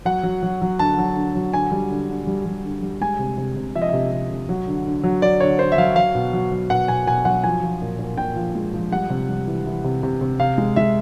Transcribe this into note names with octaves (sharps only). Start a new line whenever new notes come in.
F#3 F#5
F#3
F#3
F#3
D3 A5
F#3
D3
F#3
D3 G#5
G3
D3
D3
G3
G3
D3
G3
G#3 G#5
C3
C3
C3
F3 E5
D#5
C3 E5
C3
C3
F#3
D3
D3
F#3
F#3 D5
D3 C#5
D3 C5
E5
F#3 F5
F#3 F5
B2
F#3
F#3
B2 F#5
B2 G#5
B2 G#5
F#3 F#5
F3 G#5
F3
A#2
A#2
A#2 G5
F3
G#3
F3
G3 F#5
C3
G3
E3
E3
C3
C3
C3
C3 F5
G#3
G#3 E5